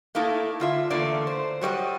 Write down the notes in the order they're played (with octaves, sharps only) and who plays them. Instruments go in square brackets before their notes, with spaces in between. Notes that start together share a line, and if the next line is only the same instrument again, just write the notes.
[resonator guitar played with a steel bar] A3 A#3 D#4 E4 A4
D3 F4 E5
E2 D3 A3 A#3 D5
C5
F#3 G3 D5 D#5